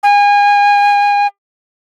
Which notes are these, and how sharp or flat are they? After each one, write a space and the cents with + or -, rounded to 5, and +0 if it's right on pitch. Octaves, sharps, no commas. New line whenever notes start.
G#5 -30